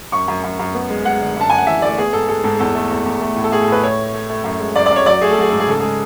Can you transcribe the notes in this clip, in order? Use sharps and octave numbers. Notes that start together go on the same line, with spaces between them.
F#2 C#6
F#2
F#2
F#2
B3
G#3
G#3 F#5
D3
F#2 A5
F#2 G#5
F#5
E3 E5
A3 D5
B3 G#4
G#2 A4
G#3 A4
G#2 A4
E2 A4
A3
E2
E2
A3
A2
A4
A2 G#4
A4
A2
B4
A3 C#5
A3
A3
A3
F#2
G#3
F#2 D5
F#2 D5
C#5
F#3 D5
A3 G#4
A4
F#3 G#4
G#2 A4
G#4
C#3 A4
G#3 G#4